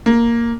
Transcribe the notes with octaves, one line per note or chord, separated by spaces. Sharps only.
A#3